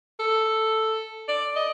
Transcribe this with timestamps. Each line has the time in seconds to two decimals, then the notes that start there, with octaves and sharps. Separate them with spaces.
0.20 A4
1.29 D5
1.56 D#5